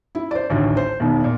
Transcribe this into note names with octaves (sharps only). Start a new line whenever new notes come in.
E4
C5 D5
A1 D2 D#3
C5
E1 D#2
A#2